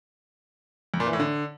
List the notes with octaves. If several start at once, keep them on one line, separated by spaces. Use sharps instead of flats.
F2
A#2
E3
A2
D3